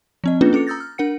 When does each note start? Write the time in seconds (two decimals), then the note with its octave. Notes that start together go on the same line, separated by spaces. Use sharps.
0.24 F3 C4 D#5
0.41 A#3 C#4 D4 F4 G#4 B4
0.53 C#4 A4 D6 C#7
0.67 A#5 D#6 E6 G6 A6 A#6
0.80 F6
0.98 D4 A#4 F#5 C#7